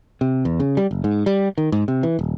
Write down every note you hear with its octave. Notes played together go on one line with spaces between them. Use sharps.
C3
E2
C#3
G3
F#1
G#2
G3
D#3
G#2
C3
E3
D#1